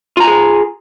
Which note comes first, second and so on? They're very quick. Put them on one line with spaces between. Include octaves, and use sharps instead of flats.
F4 A#5 G#5 G#4